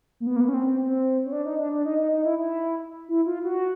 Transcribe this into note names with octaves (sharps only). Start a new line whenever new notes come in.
A#3
B3
A#3
B3
C#4
C4
C4
C4
C#4
D4
D#4
D4
D4
D#4
D#4
D#4
E4
E4
E4
F4
F#4